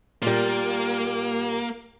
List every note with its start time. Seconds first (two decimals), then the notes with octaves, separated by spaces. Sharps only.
0.22 A#2 G3 A#3